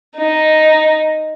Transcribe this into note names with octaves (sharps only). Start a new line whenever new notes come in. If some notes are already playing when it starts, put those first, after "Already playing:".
D#4